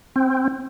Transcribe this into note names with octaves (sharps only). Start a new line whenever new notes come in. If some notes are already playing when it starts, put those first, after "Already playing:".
C4